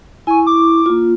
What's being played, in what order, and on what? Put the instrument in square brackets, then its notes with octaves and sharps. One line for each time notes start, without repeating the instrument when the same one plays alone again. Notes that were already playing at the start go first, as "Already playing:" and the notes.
[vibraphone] E4 C#6 [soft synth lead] G#5
[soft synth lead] D6
[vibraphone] A#3 F4